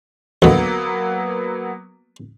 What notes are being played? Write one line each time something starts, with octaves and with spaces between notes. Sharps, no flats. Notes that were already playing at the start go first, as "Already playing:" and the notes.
D2 D#3 F#3 A#3 B3